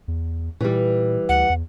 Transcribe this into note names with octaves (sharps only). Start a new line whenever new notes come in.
E2
A#2 E3 G3
D2 F#5
E2